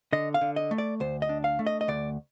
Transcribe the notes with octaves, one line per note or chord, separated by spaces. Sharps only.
D3 D#5
F5
D3
D#5
A3
D5
D2 C5
D#5
D4
F5
A3
D#5
D#5
D2 D5